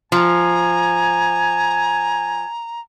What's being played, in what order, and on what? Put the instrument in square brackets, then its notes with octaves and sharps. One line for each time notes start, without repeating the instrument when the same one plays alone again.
[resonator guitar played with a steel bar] F3 [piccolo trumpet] G#5 [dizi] A#5